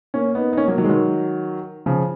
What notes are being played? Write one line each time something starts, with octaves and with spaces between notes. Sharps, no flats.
A#3 C#4
B3 D#4
D#4
A#3 C#4
F#3 A#3
D#3 F#3
G#3
D#3 F#3
C#3 F3